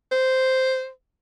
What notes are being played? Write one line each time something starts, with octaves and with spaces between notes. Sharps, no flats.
C5